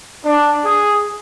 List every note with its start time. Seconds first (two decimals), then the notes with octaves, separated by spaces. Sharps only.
0.25 D4
0.64 G#4